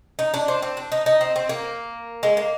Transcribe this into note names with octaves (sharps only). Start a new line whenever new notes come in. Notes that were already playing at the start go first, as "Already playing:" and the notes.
D#4
D4
C4
C4
D4
D#4
D#4
C4
C4
A#3
G#3
A#3